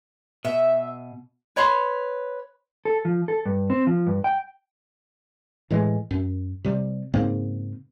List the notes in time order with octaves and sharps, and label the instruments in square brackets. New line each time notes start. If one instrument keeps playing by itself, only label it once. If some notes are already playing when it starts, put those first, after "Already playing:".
[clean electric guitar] B2 [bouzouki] E5
[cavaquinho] B4 C#5 B5 C6
[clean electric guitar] A4
F3
A4
G2
C4
F3
G2
G5
[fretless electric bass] A2 E3 G#3
F#2
C3 G3
G#2 C#3 A#3 C4